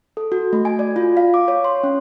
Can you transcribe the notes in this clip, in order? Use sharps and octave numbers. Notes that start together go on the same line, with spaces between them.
A4
F#4
A3
G#5
D5
F4
F5
D6
C#5
C6
C#4